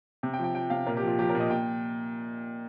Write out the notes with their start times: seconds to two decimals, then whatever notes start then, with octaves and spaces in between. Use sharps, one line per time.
0.23 C3 G5
0.34 G5
0.39 F3
0.44 G5
0.55 F3 G5
0.70 C3 F5
0.86 A#2 A#4
0.97 G4
1.02 F3
1.07 F4
1.18 F3 G4
1.29 A#4
1.35 A#2
1.40 D#5
1.50 A#2 G5